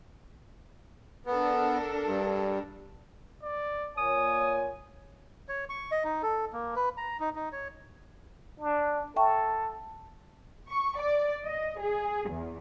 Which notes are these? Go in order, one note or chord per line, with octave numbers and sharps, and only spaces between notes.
B3 D4 A4 A#4
G2
D5
A#2 C#5 G#5 D#6
C#5
C#6
D#5
D#4
A4
A#3
B4
A#5
D#4
D#4
C#5
D4
A4 E5 G5 C#6
C#6
D5
D#5
G#4
E2